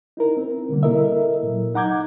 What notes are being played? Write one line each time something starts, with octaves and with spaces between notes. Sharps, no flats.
D#4 E4 A#4
C4
B2 D3 G3 A#3
E4 A4 A#4 D#5 E5
A#2 F#3
D#4 F#5 A#5 D6 G6 G#6